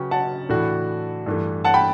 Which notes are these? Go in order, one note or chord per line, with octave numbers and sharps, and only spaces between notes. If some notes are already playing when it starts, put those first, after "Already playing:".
Already playing: C#3 F#3 C#4 F#4 B4 G5
F#5 A5
A2 E3 A3 D4 F#4
G2 E3 A3
F#5 A5
G5 B5